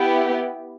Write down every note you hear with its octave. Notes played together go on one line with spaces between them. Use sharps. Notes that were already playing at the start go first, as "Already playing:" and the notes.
Already playing: B3 E4 G4